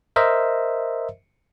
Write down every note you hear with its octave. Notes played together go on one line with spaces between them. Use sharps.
A#4 C5 D#5 E5